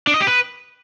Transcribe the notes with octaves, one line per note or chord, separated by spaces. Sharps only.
D4
D#5
G4
B4